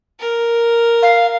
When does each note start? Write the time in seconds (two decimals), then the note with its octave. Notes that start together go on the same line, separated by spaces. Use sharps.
0.20 A#4
1.02 F5